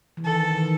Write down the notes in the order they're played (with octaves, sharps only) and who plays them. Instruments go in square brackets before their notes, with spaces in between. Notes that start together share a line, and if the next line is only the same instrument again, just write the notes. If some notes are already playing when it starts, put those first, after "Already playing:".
[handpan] E3
[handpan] D#3 [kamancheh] A4
[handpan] E3
D#3